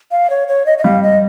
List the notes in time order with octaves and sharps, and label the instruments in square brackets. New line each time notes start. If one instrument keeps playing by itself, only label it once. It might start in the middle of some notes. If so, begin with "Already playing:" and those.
[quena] F5
C#5
C#5
D#5
D#5
[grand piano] G3 [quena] F5
[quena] D#5